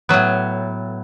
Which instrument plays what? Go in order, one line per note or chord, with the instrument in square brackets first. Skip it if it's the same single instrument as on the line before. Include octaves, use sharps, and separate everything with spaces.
[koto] A2 F#3 B3